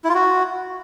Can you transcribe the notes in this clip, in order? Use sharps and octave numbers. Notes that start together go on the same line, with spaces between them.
E4
F4
F#4